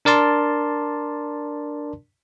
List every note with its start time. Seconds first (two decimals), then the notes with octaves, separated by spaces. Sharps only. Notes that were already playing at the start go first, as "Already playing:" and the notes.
0.05 D4 A#4 D5 A5 C6